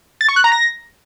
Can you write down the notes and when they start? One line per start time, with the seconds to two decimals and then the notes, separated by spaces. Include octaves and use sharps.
0.21 A6
0.29 C#6
0.36 F#6
0.44 A#5
0.52 A#6